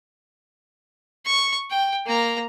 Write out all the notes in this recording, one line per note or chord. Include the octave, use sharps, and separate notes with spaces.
C#6
G5
A#3 A#5